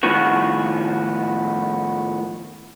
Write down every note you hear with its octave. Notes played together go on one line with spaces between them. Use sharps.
A2 D#3 F3 B3 F#4